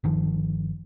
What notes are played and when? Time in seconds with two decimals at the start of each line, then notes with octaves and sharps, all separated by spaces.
0.04 G1 D#3 F3